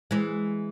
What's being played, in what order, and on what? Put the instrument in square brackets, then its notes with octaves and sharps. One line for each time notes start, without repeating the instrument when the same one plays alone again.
[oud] E3 G#3